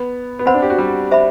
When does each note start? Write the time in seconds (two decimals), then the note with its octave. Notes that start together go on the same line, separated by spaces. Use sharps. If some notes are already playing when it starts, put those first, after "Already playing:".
Already playing: B3
0.39 B3
0.46 C4 C5 F#5 B5
0.54 D4
0.62 G4
0.70 F#4
0.78 G3
1.11 C5 E5 B5